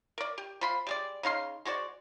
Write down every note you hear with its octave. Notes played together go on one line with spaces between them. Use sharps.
A#4 D5
G4
F3 B5 C6
G3 G#3 D5
C#3 D#4 F5 C6
G#3 F#4 C5 D5